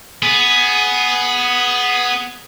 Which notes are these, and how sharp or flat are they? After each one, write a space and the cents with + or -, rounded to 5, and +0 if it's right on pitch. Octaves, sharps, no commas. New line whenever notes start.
B3 +0 G#4 +10